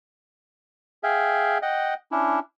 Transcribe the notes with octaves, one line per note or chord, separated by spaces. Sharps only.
G#4 E5 F5 G5 G#5
D#5 F#5 G5
C#4 D4 E4